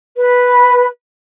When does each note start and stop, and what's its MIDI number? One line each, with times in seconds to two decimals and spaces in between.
0.16 0.86 71